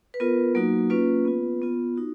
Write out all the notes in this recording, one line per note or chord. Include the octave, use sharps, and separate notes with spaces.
B4
B3 F4 A#4
F#3 A#3 D#4 F#4
A#3 C#4 F4 B4
B3 F4
B3 F4
D#4 F#4